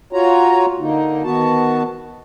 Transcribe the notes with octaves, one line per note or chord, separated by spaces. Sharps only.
F4 F#4 C#5 A#5
D3 A#3 D#4
D#3 B3 F#4 A5